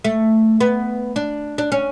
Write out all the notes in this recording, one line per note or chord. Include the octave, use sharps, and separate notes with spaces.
A3
B3
D4
D4
C#4